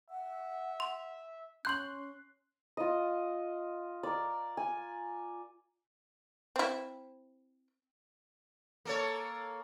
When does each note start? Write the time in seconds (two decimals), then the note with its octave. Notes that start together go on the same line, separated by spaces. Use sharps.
0.10 E5 F#5
0.80 C6
1.65 C#4 C6 F#6 G6 F#7
2.77 F4 D#5
4.03 A#4 D5
4.57 G#5
6.56 C4 E4
8.85 A#3 A4 C#5